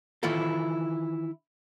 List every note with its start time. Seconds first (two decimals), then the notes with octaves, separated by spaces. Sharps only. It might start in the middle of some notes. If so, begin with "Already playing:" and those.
0.23 D#3 E3 E4 F4 A4